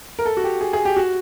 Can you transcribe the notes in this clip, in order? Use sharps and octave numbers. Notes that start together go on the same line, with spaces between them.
A#4
A4
F#4
G4
G#4
G#4
G4
F#4